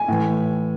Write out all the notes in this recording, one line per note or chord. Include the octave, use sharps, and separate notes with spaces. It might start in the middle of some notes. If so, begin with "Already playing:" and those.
Already playing: G#5
A2 E3